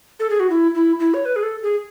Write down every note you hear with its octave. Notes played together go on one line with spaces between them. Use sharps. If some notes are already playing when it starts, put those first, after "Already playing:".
A4
G#4
F#4
E4
E4
E4
C#5
B4
G#4
A4
G#4